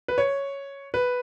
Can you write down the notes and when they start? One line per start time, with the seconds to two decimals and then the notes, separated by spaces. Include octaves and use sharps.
0.08 B4
0.18 C#5
0.94 B4